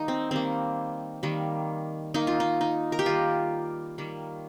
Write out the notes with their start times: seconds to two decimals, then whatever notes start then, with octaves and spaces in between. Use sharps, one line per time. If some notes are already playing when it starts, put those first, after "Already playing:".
Already playing: D#3 G3 A#3 D#4
0.08 C4
0.31 D#3 G3 A#3 C4
1.23 D#3 G3 A#3
2.14 D#3 A#3 D#4
2.27 F4
2.40 D#4
2.61 D#4
2.92 A#4
2.99 G4
3.06 D#3 G3 A#3 F4
3.98 D#3 G3 A#3